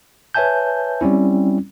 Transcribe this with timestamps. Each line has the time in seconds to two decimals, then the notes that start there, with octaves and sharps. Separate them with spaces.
0.34 B4 C#5 E5 G#5 A5 G6
1.01 G3 C4 C#4 E4